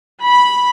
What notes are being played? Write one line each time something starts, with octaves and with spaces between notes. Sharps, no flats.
B5